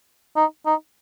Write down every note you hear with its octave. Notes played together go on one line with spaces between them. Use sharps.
D#4
D#4